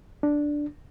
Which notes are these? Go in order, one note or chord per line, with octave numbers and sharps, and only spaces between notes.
D4